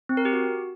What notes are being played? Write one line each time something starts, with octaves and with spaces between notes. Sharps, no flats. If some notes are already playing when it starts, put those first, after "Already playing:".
C4
A#4
G4
F#4